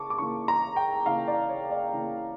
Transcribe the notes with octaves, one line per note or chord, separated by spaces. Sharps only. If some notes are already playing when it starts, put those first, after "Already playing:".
Already playing: C#3 A#3 A5 C#6 D6
D6
C#3 E3 A#3 C#6
A#5
G5
C#3 E3 A#3 F5
D5
C#5
D5
C#3 E3 A#3